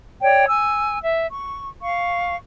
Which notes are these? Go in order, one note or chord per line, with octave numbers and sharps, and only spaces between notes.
C#5 D5 G5
G#5 E6
E5
C#6
F5 C#6